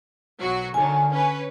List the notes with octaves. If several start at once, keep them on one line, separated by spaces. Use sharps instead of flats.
B1 F#3 F#4
D3 D#3 F#3 G#5
C#4 B4